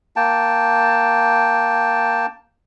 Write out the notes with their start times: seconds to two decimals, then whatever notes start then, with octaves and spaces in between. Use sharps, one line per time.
0.16 A#3 G5 A5